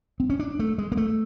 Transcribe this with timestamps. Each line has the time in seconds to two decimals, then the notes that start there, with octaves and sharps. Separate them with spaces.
0.20 C4
0.30 C#4
0.40 D4
0.59 A3
0.78 G#3
0.92 A#3
0.97 A3